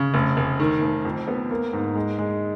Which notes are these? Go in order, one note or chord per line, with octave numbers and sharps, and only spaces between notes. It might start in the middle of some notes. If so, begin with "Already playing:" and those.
Already playing: C#3
F1
F1
D#3
F1
F2
B3
A#3
G#2
G#3
G#3